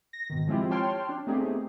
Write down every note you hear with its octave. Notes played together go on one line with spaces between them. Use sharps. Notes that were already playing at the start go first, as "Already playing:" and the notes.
A#6
G#2 B2 D#3
F3 G#3 C4 E4 F4 G4
C#5 G5 A5 C6 F6
D4
A3 B3 C4 D#4 G4 G#4